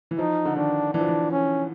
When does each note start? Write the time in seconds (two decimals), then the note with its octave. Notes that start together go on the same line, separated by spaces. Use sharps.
0.11 E3
0.19 F3 D#4
0.45 D3
0.56 D#3 D4
0.93 E3 D4
1.01 F3
1.08 E3
1.32 C#4